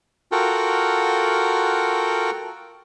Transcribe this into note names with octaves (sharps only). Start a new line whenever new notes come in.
F4 F#4 A4 A#4 F#5 G5